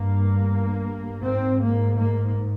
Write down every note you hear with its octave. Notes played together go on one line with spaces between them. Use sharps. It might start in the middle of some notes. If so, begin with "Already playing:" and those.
Already playing: G2 A#3
G#2 C4
A#3
A#3